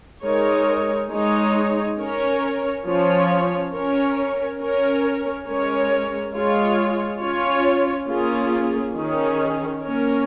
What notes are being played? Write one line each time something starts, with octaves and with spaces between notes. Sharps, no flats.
G#3 D#4 A#4 C#5
G#3 D#4 C#5
C#4 A#4 C#5
F3 C#4 F4 C#5
C#4 A#4 C#5
C#4 A#4 C#5
G#3 C#4 A#4 C#5
G#3 F4 C#5
C#4 F4 C#5
A#3 C#4 F4 G#4
D#3 C#4 G#4
A#3 C#4 A#4 C#5